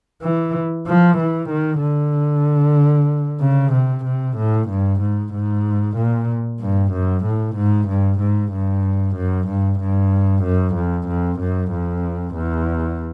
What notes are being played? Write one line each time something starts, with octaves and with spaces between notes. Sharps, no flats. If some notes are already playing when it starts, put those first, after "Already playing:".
E3
F3
E3
D#3
D3
C#3
C3
C3
A2
G2
G#2
G#2
A#2
G2
F#2
A2
G#2
G2
G#2
G2
F#2
G2
G2
F#2
F2
F2
F#2
F2
E2